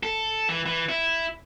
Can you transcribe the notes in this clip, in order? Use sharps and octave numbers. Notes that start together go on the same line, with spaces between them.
A4
E3
E3
E4